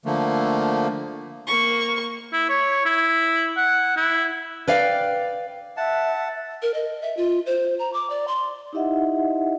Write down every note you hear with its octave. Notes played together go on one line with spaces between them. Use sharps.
D3 F3 A3 A#3
A#3 C#6
E4
C#5
E4
F#5
E4
B4 D5 F5 G5
E5 F#5 A5
A#4
D#5
E5
F4
C5
A#5
D6
D5
C6
D#4 E4 G4 D#5 E5 F#5